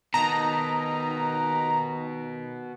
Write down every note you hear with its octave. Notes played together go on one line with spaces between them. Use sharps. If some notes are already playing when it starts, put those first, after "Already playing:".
B2 D#3 B3 D#4 A5 A#5